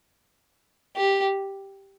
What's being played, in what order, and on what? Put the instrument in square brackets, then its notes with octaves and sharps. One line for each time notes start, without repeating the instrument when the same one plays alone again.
[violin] G4